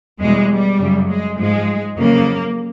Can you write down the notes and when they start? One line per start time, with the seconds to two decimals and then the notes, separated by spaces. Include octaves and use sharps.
0.20 E2 B2 G3 G#3
0.49 G3
0.79 F#2 C#3 F#3
1.09 G#3
1.39 G#2 F3 G#3
1.97 F2 C#3 F#3 A#3